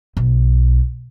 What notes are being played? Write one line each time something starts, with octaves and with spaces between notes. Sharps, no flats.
B1